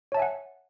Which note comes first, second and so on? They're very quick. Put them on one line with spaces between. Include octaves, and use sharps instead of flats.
C#5 A5 E5 G#5 F#5